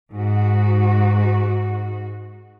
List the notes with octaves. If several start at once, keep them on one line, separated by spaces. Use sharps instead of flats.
G#2 F#4